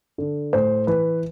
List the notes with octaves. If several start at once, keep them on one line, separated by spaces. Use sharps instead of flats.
D3
A2 C5
E3 B4